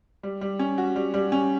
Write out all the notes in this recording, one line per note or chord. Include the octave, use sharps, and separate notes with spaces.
G3
G3
C#4
F#4
G3
G3
C#4